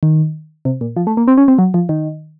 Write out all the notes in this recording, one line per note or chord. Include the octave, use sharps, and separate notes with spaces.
D#3
C3
A#2
F3
A3
A#3
C4
C#4
C4
F#3
F3
D#3